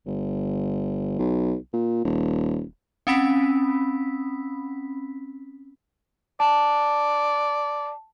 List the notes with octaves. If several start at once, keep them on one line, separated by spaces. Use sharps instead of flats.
G1
B1
A#2
D#1
C4 C#4 B5 B6
D5 A5